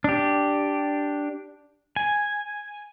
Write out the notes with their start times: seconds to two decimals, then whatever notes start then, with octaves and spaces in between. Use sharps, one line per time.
0.04 D4 G4
1.96 G#5